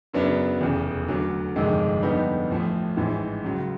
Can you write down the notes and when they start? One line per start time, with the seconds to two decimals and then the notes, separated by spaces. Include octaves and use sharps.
0.13 F#2 C#3 F#3 B3 D4
0.61 F1 E2 C#3
1.08 D2 D3 F#3
1.56 G1 F2 C3 D#3 G#3
2.02 F2 D3 G3 B3 D#4
2.50 A1 A2 F3 A3
2.97 A1 G#2 E3
3.44 C#2 C#3 F#3